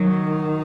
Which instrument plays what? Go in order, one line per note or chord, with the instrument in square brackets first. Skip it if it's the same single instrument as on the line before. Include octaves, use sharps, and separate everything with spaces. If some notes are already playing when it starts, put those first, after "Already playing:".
Already playing: [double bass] D#3 [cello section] F#3